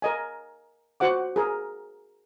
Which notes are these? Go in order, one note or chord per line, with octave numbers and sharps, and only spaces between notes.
A#4 D#5 G#5
F#4 C5 F#5 D6
G#4 A#4